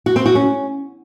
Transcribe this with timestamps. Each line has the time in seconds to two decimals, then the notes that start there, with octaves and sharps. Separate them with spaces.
0.06 F#4
0.16 C4
0.26 F#4
0.35 C#4